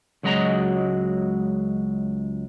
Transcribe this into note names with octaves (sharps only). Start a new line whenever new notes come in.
C#2 F#3 G#3 F#4 D#5 A#5